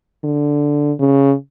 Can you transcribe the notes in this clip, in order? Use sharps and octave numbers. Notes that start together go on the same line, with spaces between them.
D3
C#3